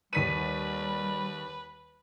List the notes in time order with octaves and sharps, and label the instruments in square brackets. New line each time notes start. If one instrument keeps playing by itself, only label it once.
[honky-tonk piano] D#2 B6 D#7 [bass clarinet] G3 [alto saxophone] B4